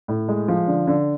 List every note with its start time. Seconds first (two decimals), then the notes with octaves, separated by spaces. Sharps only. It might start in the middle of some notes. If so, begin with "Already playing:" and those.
0.08 A2
0.28 G#3
0.48 F3
0.67 D3
0.87 D3